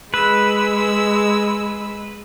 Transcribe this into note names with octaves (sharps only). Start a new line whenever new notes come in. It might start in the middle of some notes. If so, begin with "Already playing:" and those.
G#3 B4 E6